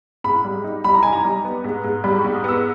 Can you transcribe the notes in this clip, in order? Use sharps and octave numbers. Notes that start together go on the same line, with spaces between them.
G#2 B5
G3
D#4
G3 B5
A#5
D#4 G#5
A#5
G3
B3
G#2
G#2
G3 B5
C#6
G#2
D#6
B3 E6